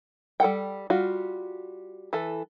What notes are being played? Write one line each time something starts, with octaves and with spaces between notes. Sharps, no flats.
G3 A4 F#5 G5
G3 F4 F#4
E3 A4